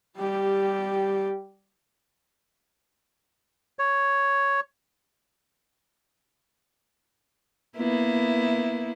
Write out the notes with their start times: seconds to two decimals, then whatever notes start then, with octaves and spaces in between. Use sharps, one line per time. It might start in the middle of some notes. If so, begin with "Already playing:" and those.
0.17 G3 G4
3.79 C#5
7.77 A#3 B3 E4